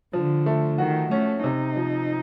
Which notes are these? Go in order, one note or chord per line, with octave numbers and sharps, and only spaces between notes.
D3 F3
A3
D#3 F#4
A3 C#4
C3 D#4
F3